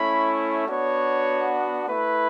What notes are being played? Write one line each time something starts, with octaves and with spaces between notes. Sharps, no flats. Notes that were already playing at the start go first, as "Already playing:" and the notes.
Already playing: A3 C#4 E4 B5
B3 D4 F#4 C#5
A3 E4 B4